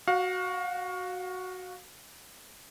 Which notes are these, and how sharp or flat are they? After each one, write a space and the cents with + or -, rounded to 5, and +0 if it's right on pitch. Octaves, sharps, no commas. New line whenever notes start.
F#4 +0 F5 +30